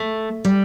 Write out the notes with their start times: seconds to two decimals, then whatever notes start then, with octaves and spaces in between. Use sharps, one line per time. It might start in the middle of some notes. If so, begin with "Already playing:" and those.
Already playing: A3
0.45 G3